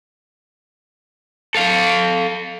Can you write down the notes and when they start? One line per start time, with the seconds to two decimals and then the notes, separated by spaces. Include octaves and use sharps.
1.55 A4 F5